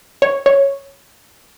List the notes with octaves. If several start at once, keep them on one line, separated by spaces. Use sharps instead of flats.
C#5
C#5